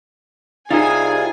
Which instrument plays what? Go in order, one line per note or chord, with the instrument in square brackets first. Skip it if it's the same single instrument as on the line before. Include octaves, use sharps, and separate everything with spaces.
[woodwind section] C2 G#4 [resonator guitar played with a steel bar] D#4 [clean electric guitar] F4 E5 [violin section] G#5